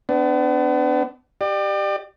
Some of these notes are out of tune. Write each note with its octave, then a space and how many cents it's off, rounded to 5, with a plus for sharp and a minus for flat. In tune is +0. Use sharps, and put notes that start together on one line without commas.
B3 +40 D4 +0
G4 +0 D5 +35